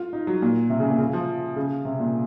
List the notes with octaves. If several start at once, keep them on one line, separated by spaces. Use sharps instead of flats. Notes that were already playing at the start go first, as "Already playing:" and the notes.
Already playing: F4
D#4
F#3
A#2
C3
C#3
A#2
C#3
F3
C#3
C3
A#2